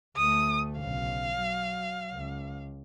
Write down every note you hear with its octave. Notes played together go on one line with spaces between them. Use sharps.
D2 A3 D#6
B1 C#3 F5
F#3
C#2